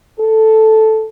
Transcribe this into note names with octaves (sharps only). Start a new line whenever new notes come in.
A4